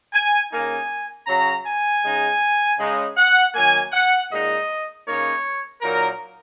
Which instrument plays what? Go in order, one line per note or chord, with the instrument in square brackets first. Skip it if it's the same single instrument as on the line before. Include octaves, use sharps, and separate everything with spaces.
[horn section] G#5
C#3 A#3 D#4 G#5
C#3 F#3 C#4 A#5
G#5
C#3 G#3 D#4
C#3 G#3 D#4
F#5
D#3 F#3 A#3 G#5
F#5
A#2 G#3 D#4 D#5
C#3 A#3 D#4 C#5
A#2 F#3 A#3 D#4 A#4